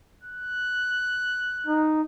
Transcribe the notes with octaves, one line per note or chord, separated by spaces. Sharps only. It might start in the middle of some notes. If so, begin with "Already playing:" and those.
F#6
D#4